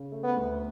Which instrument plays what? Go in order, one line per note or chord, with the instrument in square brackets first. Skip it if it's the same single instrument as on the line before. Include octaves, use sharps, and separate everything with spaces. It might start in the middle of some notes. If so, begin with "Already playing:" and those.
Already playing: [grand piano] C#3
A3
[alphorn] B3
[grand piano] D2